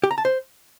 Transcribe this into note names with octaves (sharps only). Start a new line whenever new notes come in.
G4
A#5
A5
C5